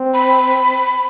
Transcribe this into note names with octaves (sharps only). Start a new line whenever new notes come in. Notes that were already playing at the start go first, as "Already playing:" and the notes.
Already playing: C4
B5